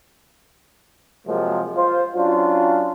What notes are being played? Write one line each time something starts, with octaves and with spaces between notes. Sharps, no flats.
C3 F3 F#3 G#3 A#3
F4 C5
F#3 C#4 D4 F4